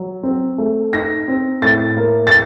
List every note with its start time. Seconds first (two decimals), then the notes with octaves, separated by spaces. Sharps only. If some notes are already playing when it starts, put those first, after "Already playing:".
Already playing: F#3
0.23 C4
0.58 A3
0.93 D#4 A#6
1.28 C4
1.62 A2 A6
1.97 A#3
2.27 A6